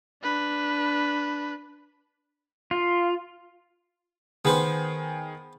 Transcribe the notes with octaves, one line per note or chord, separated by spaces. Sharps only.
D4 B4
F4
D#3 B3 G#4 B4 C5